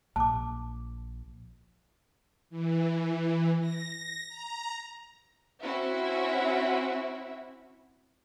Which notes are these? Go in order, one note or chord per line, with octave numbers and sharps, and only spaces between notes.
A#1 A5 D6
E3
A#6
A#5
C4 C#4 E4 F#4 E5